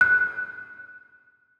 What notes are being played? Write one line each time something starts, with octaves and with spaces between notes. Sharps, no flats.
F#6